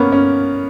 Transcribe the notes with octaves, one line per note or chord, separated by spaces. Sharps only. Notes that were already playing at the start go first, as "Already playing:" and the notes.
Already playing: A#3 B3 C#4
C#4